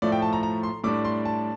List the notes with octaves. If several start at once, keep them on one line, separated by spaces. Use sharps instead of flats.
A2 F3 A3 D5
G5
A5
A#5
A#5
C6
A2 G3 D4 D6
C6
A5